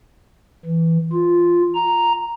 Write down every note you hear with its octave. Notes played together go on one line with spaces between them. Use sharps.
E3
F4
A#5